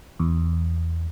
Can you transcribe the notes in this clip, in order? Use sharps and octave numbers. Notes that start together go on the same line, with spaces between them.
E2